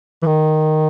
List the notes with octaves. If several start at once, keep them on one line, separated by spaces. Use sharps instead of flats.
E3
D#3